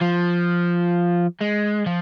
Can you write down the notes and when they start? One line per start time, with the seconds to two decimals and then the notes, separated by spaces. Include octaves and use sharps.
0.01 F3
1.41 G#3
1.86 F3